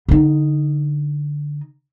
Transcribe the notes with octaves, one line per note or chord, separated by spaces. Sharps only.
D3 D#4